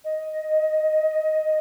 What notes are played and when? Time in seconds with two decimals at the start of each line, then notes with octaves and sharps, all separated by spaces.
0.04 D#5